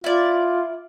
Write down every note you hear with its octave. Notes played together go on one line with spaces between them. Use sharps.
E4 F4 D5